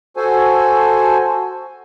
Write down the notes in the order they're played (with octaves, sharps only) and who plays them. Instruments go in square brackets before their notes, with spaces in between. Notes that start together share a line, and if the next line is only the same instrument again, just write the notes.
[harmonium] F#4 A4 C5 G#5